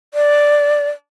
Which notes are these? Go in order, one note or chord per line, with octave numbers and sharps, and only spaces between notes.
D5